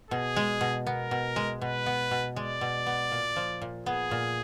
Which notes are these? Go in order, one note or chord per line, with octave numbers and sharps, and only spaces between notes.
B2 G#4
G#3
B2
B3 A#4
B2
G#3
B2 B4
B3
B2
G#3 D5
B2
B3
A#2
F3
A#2
B3 G#4
A#2